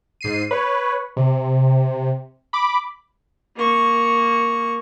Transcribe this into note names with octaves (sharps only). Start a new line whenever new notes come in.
G#2 C7 D#7
B4 C#5
C3
B5 D6
A#3 C#6